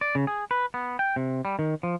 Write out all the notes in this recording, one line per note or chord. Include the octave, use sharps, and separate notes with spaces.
D5
C#3
G#4
B4
B3
G5
C3
G3
D#3
F3